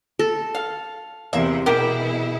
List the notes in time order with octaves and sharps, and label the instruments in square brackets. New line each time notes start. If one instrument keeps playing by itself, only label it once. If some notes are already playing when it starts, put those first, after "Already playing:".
[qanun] A4
[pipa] F5
[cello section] E2 C3 [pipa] A#3 E5
[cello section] B2 E4 G#4 [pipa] G4 A#4